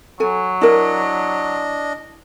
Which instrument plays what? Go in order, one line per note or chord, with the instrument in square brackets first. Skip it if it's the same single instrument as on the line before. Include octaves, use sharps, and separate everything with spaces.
[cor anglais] F#3 [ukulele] A4 G#5
[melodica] D4 D#5 [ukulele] E4 A#4